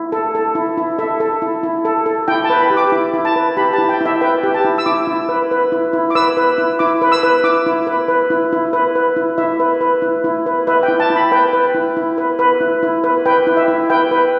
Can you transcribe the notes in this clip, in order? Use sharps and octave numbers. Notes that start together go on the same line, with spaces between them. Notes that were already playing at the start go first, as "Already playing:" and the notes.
Already playing: E4
A4
A4
E4
E4
A4 E5
A4
E4
E4
A4
A4
E4 G5
A5
B4
B5
G4
D6
E4
E4
A5
B4
G4 B5
A5
E4
G5
E4 E5
B4 G5
G4
A5
E4
E6
E4 D6
E4
B4
B4
E4
E4
D6
B4 E6
B4
E4
E4 D6
B4
E6
B4
E4 D6
E4
B4
B4
E4
E4
B4
B4
E4
E4 E5
B4
B4
E4
E4
B4
B4 E5
G5
E4
A5
E4
B5
B4 G5
B4
E4
E4
B4
B4
E4
E4
B4
B4 G5
E4
E5
E4
B4 G5
B4